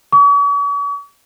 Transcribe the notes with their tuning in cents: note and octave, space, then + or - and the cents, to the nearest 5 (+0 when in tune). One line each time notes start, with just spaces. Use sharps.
C#6 +45